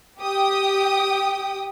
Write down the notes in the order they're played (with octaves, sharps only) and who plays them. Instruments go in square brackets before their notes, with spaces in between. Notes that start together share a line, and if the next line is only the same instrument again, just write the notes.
[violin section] G4 G5 D#6